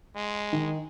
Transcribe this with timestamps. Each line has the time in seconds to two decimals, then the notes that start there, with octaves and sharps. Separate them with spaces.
0.16 G#3
0.53 D#3